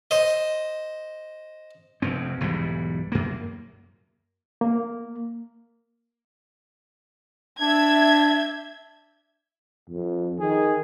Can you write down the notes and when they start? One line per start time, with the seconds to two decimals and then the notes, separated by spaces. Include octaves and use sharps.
0.11 C5 D#5
2.02 F1 F2 C4
2.41 B1 E2 G#2 G3
3.12 F#2 A#3
4.61 A#3
7.61 D4 E5 G#6
9.90 F2
10.40 D#3 G#4